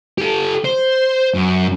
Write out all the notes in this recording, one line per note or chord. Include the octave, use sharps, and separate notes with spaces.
G4 A4
C5
F#2